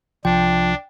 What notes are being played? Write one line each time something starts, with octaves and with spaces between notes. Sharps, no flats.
C2 F3 D4 G5